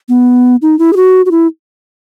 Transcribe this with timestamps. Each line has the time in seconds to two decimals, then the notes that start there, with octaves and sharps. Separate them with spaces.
0.09 B3
0.62 D#4
0.79 E4
0.93 G#4
0.96 F#4
1.26 F#4
1.31 E4